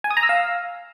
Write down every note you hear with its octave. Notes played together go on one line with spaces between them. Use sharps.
G#5
D#6
A#5
E6
F5